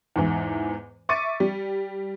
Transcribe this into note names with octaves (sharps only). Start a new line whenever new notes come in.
E2 G#2 E3
E5 C#6 D6 A6 C#7 D#7
G3